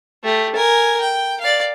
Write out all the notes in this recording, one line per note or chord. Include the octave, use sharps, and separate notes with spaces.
A3 G4
A#4 G#5
G5
D5 F5